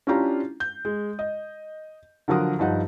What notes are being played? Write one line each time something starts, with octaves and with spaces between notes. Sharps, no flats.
C#4 D4 E4 F4 G4 A#5
G6
G#3
D#5
D3 F3 F#3 A#4 F#5 D#6
G2 F3 D#4 F#5